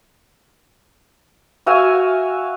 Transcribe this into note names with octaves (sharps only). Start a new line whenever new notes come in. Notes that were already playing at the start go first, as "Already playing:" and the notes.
F#4 E5 F5 G#5